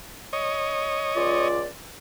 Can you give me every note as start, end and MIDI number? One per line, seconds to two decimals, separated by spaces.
0.33 1.48 73
0.33 1.48 75
1.15 1.65 37
1.15 1.65 65
1.15 1.65 74